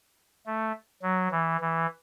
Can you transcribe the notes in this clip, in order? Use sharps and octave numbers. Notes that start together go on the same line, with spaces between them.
A3
F#3
E3
E3